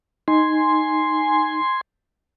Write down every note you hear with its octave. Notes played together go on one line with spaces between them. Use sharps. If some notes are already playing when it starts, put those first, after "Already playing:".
D#4 G#5 C6